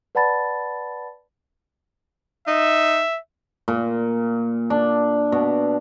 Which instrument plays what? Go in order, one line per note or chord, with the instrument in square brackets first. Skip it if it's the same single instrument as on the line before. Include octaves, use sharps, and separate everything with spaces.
[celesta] B4 D5 F#5 A5 B5 A6
[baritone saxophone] D#4 [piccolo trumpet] E5
[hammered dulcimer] A#2
D4
B2